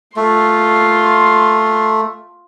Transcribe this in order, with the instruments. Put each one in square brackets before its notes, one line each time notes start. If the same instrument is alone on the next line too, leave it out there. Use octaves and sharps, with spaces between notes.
[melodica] A3 [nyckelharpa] F4 C6